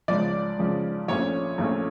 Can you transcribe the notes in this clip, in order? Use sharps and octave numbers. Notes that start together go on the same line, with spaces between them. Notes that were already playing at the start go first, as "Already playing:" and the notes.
C#2 C#3 F3 D5
C#2 C#3 F3
A#1 A#2 A3 C#4 C#5
A#1 A#2 A3 C#4